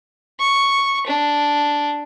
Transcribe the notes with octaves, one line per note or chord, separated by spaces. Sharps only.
C#6
D4